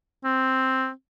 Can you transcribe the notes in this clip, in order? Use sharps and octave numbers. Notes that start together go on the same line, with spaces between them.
C4